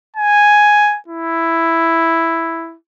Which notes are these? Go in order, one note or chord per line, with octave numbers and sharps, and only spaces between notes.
G#5
E4